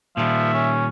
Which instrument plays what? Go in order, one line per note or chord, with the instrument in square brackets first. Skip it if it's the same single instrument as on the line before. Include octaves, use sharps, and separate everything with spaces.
[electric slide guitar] A#2 D#3 G3 [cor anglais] F3 [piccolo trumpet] E5
[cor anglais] C#4